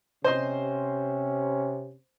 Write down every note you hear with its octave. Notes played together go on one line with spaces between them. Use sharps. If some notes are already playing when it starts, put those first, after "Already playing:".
C3 C#4 C5 D#5 C6